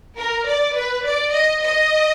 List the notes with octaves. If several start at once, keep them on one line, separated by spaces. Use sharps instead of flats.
A#4
D5
B4
D5
D#5
D#5